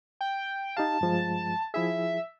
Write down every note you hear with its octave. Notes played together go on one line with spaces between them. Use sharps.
G5
D#4 G4 F5 A5
G2 F3 G#3
F3 E4 G#4 E5